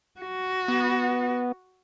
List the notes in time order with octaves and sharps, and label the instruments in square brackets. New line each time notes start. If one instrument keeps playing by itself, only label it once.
[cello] F#4
[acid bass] B3